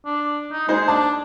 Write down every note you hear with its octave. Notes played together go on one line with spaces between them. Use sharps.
D4
D#4
G#3 D#4 C5
D4 A5